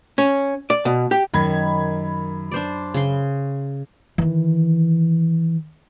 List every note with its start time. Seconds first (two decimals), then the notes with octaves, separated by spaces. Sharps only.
0.18 C#4
0.70 D5
0.85 B2
1.11 G4
1.34 F#2 D#3 B5 G#6
2.51 D4 C5 D5
2.94 C#3 C6
4.18 D#3 E3